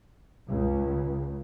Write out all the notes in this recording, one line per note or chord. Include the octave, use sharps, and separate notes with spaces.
C#2